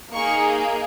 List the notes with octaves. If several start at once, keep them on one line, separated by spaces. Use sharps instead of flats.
A#3 D#4 G#4 C#6